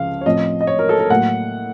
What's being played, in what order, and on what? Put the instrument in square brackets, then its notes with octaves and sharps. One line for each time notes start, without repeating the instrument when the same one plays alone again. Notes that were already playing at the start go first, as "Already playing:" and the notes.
Already playing: [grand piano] C#2 C#3 F3 [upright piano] F5
[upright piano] C#5
[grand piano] A2 F3 C4 [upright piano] D#5
[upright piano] D#5
C#5
A#4
A4
A#4
[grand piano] A2 F#3 A#3 [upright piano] F#5